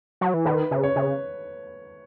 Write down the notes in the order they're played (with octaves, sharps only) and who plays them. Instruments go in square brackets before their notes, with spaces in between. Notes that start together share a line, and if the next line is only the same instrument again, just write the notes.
[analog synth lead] F#3
E3
[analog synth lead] D#3 [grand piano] B4
[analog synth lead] C#3
[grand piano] C#5
[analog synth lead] C#3